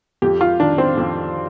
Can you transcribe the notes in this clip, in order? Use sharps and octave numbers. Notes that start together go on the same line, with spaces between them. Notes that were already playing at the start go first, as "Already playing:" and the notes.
F2 G4
F4
D#3 D4
C4
F2